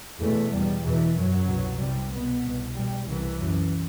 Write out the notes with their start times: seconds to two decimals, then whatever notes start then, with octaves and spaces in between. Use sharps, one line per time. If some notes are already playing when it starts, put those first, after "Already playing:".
0.21 E2 B2 A3
0.53 E2 B2 G3
0.84 E2 B2 E3
1.16 F#2 F#3
1.48 C2 B2
1.80 C2 C3 G3
2.12 C2 B2 B3
2.43 C2 B2
2.75 E2 B2 G3
3.08 C2 C3 E3
3.39 F#2